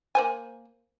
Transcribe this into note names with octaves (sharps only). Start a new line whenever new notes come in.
A#3 C5 G#5